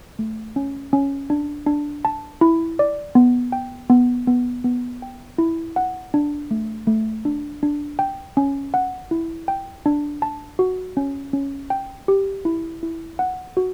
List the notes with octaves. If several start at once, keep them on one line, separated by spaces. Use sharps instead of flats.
A3
C#4
C#4
D4
D4
A5
E4
D5
B3
G5
B3
B3
B3
G5
E4
F#5
D4
A3
A3
D4
D4
G5
C#4
F#5
E4
G5
D4
A5
F#4
C#4
C#4
G5
G4
E4
E4
F#5
F#4